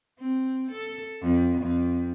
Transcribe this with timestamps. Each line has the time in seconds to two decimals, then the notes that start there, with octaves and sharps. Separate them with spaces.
0.20 C4
0.71 A4
1.22 F2
1.61 F2